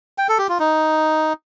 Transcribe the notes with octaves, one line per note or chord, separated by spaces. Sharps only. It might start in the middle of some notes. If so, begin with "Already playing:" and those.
G5
A4
G4
F4
D#4